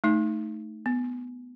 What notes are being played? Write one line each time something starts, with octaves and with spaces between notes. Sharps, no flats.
A3 D#4
B3